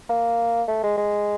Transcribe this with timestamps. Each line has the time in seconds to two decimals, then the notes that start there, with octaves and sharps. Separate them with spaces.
0.09 A#3
0.68 A3
0.83 G#3
0.97 G#3